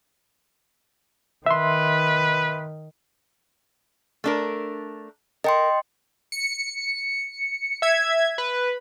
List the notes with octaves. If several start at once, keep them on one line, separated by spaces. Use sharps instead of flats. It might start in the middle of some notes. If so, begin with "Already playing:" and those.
D#3 B4 E5 C6
A3 D4 A#4
A#4 D#5 G5 C6
C#7
E5 G#6
B4